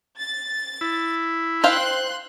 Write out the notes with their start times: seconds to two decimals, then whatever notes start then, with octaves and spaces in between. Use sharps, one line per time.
0.17 A6
0.81 E4
1.64 C5 F5 G5 C6 F#6